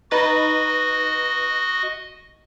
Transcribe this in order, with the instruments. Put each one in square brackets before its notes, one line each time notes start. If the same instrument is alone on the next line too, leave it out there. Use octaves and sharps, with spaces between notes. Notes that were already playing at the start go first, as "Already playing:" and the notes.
[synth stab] D#4 B4 A6 [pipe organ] F#4 D#5